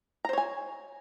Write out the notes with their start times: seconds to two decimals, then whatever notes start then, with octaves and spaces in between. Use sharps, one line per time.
0.25 A#5
0.29 C5
0.33 C#5
0.38 G#5